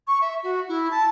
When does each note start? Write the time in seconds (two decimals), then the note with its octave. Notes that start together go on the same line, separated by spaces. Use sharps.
0.07 C#6
0.22 E5
0.43 F#4
0.69 E4
0.91 A5